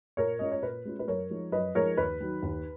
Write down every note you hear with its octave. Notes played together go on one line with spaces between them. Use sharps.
A#2 A#4 C#5
G#3 C#4 F4 D#5
C#5
A#2 B4
G#3 C#4 F4
B4
F#2 A#4 C#5
F3 G#3 D#4
F#2 B4 D#5
F3 G#3 D#4 A#4 C#5
D#2 B4
D#3 F#3
D#2